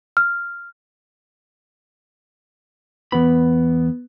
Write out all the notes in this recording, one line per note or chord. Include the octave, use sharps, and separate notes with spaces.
F6
E2 B3 B5